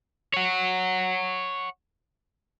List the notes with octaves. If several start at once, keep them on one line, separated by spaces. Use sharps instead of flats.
C#5 F#5